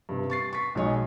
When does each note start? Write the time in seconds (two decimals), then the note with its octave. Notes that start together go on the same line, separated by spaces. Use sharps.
0.09 G2 C3
0.30 C#6 A6 C7
0.53 C#6 B6
0.75 B1 G#3 C#5 D#5